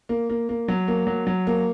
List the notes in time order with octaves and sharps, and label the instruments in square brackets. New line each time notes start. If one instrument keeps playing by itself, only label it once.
[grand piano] A#3
A#3
A#3
F#3
A#3
F#3
F#3
A#3